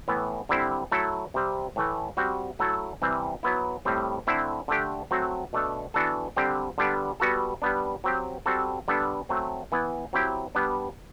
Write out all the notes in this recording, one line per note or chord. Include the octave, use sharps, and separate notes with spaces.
A2 E3 B3
D3 G3 C4 E4
F#3 A3 E4 A4
C3 G3 C4
A2 E3 A3
G3 C4 F#4
F#3 A3 E4 A4
C3 E3 G3 C4
F#3 B3 E4
A2 G3 C4
D3 A3 C4 E4
D3 A3 D4 G4
F#3 A3 C4 F#4
B2 A3 D4 A4
E3 B3 D4 F#4 A4
D3 G3 C4 G4
D3 G3 B3 D4
G3 B3 F#4 A4
G3 B3 D4
F#3 C4 G4
G3 C4 F#4 A4
D3 G3 B3 D4 A4
F#3 A3 C4
E3 B3 E4
F#3 C4 E4 G4
G3 B3 D4